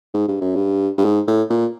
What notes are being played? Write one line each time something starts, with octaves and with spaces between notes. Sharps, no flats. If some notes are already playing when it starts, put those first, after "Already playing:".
G#2
G2
F#2
G2
G2
G#2
A2
A#2